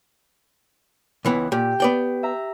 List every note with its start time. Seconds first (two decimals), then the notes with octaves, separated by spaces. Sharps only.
1.25 C#2 E3 B3
1.52 A#2 G4
1.80 B3 D5 G5
2.23 E5 A#5